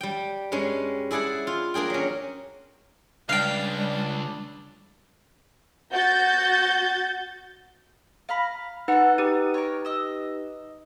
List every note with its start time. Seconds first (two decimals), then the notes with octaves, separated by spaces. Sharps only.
0.01 G3 G5
0.52 G2 G#3 C#4
1.11 E4 G#4 D5 F#5 A5
1.47 F4
1.74 A#3 D4 G#4 G5
1.90 F#3 C#4
3.29 C#2 G3 D4 F5 G5
5.92 F#4 G6 A6
8.29 F5 A#5 B5
8.88 D#4 F#4 A4 B4
9.18 D#4 G4 B4 D#6
9.54 A#4 C#5
9.85 D#5 E6